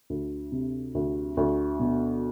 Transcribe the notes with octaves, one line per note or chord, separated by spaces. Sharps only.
D2
C3
D2
D2
B2